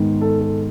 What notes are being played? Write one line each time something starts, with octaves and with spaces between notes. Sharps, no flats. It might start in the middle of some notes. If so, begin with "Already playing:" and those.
Already playing: G#2 D#3 G#3 B3
A4
A4